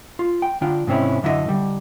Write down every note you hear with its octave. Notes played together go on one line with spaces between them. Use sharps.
F4
G5
D3 D4 F4 G5
G#2 C3 C4 C#4 E4
F#2 D3 E4 F4 D#5
D3 G3